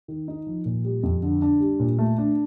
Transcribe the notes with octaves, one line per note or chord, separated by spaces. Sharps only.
D#3
D#4
F3
A#2
G3
F2
D3
D4
G3
A#2
A3
D4